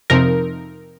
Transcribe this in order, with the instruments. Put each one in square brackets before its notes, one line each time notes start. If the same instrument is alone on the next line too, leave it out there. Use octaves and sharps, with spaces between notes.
[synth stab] F2 C3 F3 C4 D#4 A#4